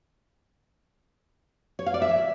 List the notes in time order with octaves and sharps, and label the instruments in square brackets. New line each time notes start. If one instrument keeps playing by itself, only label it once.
[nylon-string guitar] C#5
F5
D5
E5